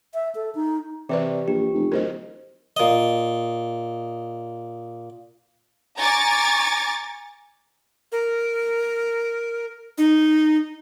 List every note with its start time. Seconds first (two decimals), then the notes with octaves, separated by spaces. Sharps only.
0.14 E5
0.35 A4
0.55 D#4
1.09 C3 E3 G4 B4 D5
1.48 A#1 G4
1.73 F1
1.92 D1 A#4 C5 D#5
2.77 A#2 D#5
5.99 G#5 A#5 C#6 D6 A6
8.12 A#4
9.98 D#4